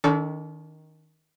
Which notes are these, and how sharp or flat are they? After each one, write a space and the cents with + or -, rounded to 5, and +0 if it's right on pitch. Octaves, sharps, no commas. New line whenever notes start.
D#3 +10 D4 -40 A4 +0